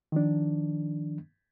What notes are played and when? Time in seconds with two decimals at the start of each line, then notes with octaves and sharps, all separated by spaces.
0.12 D#3 F3 D4